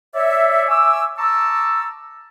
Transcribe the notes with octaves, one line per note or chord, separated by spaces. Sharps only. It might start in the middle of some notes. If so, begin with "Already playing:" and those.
C#5 D5 E5
E5 G#5 C#6 D6 E6
A5 A#5 C#6 D6 E6